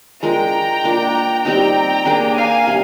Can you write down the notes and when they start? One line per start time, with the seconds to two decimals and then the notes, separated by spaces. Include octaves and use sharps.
0.23 G#3 D4 F4 A#4 G5 A#5
0.84 A#3 D4 F4
1.45 G3 C4 D#4 G4 G5 A#5
2.05 A#3 D4 G#4
2.36 F5 G#5
2.67 C3 G3